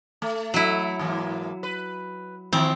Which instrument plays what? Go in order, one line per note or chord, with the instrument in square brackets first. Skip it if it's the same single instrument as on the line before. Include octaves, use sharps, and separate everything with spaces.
[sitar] A3
[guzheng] F#3 E4
[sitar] G#2 E3 A#3
B4
[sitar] D#3 F3 [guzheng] C4